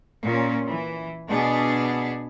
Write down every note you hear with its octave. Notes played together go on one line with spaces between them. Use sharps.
A#2 C#4
E3
B2 B3 D4 G#4